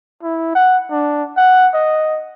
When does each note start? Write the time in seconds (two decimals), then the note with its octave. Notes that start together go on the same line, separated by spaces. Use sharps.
0.23 E4
0.55 F#5
0.91 D4
1.37 F#5
1.74 D#5